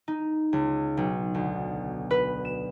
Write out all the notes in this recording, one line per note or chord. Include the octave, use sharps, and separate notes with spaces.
D#4
C#2
B1
D2
B4
E7